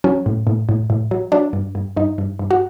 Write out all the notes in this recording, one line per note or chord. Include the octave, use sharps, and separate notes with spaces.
F#3 C#4
A2
A2
A2
A2
F#3
F#3 D4
G2
G2
G2 D#4
G2
G2
F#4